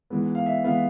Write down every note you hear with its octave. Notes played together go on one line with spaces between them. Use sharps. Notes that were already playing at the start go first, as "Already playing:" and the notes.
G#2 E3 G#3 B3
F5
E5
E3 G#3 B3 F5